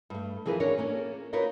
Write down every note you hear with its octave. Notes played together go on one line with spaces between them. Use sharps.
G2 A3
E3 F3 G#4 A#4 B4
C#4 D4 A#4 C#5
A#3 C#4 A4
D#4 F4 F#4 A#4 B4 C#5